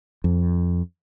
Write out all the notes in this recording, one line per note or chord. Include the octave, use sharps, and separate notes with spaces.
F2